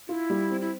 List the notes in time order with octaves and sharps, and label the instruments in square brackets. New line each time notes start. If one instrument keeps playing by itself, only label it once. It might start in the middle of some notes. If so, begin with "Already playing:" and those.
[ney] E4 [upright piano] F4
[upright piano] G3
C4
[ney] E4